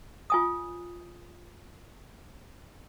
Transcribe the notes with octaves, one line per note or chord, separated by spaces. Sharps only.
F4 G#5 D#6